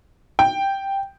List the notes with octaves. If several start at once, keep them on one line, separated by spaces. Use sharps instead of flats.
G5